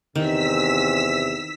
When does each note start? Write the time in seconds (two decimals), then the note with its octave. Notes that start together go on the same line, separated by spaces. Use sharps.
0.15 E2 C3 D#3 E6 B6